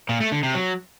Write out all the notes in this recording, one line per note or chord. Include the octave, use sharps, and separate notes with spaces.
A#2
A3
D3
C3
F#3